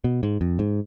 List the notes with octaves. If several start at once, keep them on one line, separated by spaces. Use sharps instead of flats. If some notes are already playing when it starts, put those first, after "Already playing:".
B2
G#2
F2
G#2